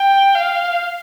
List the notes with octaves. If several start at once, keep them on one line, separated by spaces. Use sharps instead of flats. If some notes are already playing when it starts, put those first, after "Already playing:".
Already playing: G5
F5